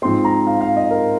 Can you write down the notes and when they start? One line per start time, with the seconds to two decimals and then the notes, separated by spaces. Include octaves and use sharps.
0.02 G#2 F3 C4 C6
0.25 A#5
0.47 F5
0.61 F5
0.76 D#5
0.91 A#4